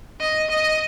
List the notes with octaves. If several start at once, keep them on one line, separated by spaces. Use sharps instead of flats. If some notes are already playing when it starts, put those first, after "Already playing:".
D#5
D#5